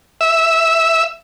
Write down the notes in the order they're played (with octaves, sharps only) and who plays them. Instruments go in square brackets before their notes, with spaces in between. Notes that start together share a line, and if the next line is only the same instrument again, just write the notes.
[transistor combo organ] E5